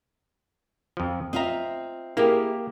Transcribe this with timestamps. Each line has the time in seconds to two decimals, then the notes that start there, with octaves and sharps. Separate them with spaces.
0.97 F2 F3
1.33 C4 F4 D#5 E5 A#5
2.17 A#3 E4 G4 G#4 A#4